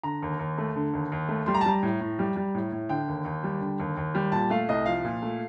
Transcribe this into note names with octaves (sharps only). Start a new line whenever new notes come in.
D3 A#5
D#2
D#2
A3
D3
D#2
D#2
A3
G3 C6
A#5
A5
G3 A#5
A2
A2
G3
G3
A2
A2
D3 G5
D#2
D#2
G3
D3
D#2
D#2
G3
A#2 A5
A3 F5
C2 D#5
F3 F5
A#2
A3